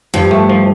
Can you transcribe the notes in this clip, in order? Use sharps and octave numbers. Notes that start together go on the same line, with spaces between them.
G2 F3
A3
F3